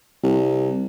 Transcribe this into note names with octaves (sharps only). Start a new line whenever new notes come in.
C2